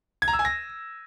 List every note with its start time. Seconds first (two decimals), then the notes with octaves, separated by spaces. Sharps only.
0.22 G#6
0.28 A#5
0.33 E6
0.39 G#5
0.45 A#6